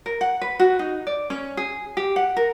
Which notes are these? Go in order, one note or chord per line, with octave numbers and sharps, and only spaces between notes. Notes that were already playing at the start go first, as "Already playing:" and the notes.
A#4
F#5
B4
F#4
D#4
D5
C#4
G#4
G4
F#5
A#4